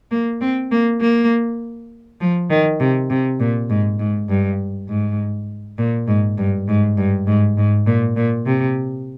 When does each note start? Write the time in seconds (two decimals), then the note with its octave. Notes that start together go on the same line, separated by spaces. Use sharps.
0.11 A#3
0.41 C4
0.71 A#3
1.01 A#3
2.21 F3
2.50 D#3
2.80 C3
3.10 C3
3.40 A#2
3.69 G#2
3.99 G#2
4.29 G2
4.88 G#2
5.78 A#2
6.07 G#2
6.38 G2
6.68 G#2
6.97 G2
7.27 G#2
7.57 G#2
7.86 A#2
8.16 A#2
8.46 C3